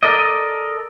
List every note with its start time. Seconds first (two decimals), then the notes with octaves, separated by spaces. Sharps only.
0.03 A4 A#4 D5 D#5